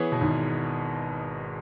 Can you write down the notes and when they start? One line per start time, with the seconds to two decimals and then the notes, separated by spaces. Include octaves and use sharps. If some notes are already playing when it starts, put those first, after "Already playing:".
Already playing: E3 B3 G#4 C#5
0.12 B2
0.21 G#1 G#2